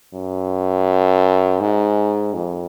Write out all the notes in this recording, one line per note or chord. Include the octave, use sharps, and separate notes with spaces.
F#2
G#2
F2